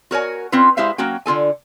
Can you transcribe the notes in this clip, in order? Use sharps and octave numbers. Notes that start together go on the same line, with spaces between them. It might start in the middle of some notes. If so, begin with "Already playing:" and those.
F#4 A#4 C#5 G#5
C4 C#4 F4 B4
G#3 E4 G4 C5 E5 F5
F#3 A#3 C#4 F#4 G5
D3 F4 A4 G#5